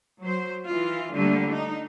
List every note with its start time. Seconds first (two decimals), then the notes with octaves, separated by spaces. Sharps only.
0.23 F#3 C5
0.65 E3 F4
1.14 D3 G3 A3 A#3
1.51 D#4